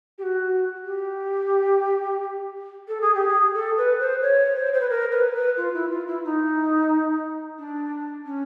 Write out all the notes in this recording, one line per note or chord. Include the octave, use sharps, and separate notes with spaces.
G4
F#4
G4
A4
G#4
G4
G#4
A4
B4
C5
C#5
C5
C5
B4
A#4
B4
B4
F4
E4
F4
E4
D#4
D4
C#4